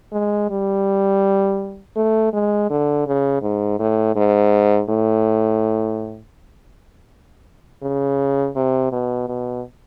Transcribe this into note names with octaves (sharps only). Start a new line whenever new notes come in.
G#3
G3
A3
G#3
D3
C#3
G#2
A2
G#2
A2
C#3
C3
B2
B2